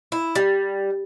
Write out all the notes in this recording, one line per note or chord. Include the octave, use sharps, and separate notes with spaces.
E4
G3